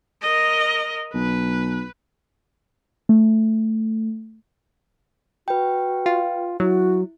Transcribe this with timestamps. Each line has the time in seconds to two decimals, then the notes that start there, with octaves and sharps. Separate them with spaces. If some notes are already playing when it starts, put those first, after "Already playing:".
0.22 A#4 D#5
1.14 B1 B4
3.09 A3
5.48 F#4 B4 G5
6.06 F4
6.60 F#3 E4 F#4